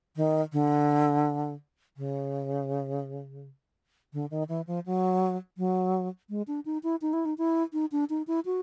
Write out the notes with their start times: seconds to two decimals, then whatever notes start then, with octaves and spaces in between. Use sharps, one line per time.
0.16 D#3
0.53 D3
1.97 C#3
4.13 D3
4.31 D#3
4.49 E3
4.67 F3
4.86 F#3
5.58 F#3
6.30 G#3
6.48 D4
6.65 D#4
6.83 E4
7.02 D#4
7.13 E4
7.25 D#4
7.38 E4
7.73 D#4
7.92 D4
8.10 D#4
8.27 E4
8.45 F#4